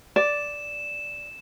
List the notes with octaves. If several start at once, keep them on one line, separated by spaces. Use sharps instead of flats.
D5 E7